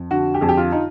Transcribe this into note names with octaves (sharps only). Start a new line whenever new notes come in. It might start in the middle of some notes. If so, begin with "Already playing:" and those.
Already playing: F2
D3 F#4
G4
F2 G#4
G4
F4
D#4